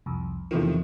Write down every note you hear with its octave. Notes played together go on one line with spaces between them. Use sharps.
C2 F2
E2 A2 C3 D#3 F3